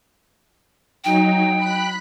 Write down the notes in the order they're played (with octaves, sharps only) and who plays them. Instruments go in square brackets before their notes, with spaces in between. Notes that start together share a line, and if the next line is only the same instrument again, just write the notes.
[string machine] F#3 D#4 [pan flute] G5
[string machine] B5 F#6 B6